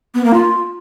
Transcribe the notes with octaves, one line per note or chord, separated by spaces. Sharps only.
B3
A#3
F4